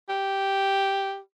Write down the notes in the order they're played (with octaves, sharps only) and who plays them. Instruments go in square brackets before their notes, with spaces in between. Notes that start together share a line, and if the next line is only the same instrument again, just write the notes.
[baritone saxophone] G4